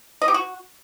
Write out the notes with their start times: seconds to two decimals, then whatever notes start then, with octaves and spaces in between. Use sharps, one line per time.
0.22 D#5
0.28 G4
0.34 F#4